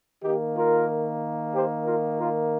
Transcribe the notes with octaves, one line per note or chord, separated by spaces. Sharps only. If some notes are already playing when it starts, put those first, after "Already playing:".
D#3 A#3 D#4 G4
F4 A#4
G4 C5
F4 A#4
F4 A#4